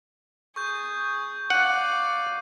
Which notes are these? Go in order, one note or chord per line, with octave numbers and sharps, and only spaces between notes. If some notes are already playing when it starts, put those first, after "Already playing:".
G#4 C#6 G6
D5 F5 F#5 D#7